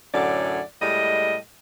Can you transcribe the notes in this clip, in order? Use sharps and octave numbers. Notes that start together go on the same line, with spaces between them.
F#2 A2 D3 C#5 D5
A2 G3 G#3 D#5